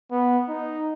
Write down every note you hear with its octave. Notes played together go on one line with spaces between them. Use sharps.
B3
D#4